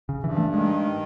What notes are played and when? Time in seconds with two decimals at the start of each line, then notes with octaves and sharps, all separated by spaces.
0.09 C#3
0.23 G2 E3
0.38 A3
0.54 D#3 G#3